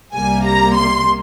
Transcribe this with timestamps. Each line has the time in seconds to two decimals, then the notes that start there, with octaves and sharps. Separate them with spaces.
0.15 C2 C3 G3 A#3 G#5
0.45 A#5
0.75 C6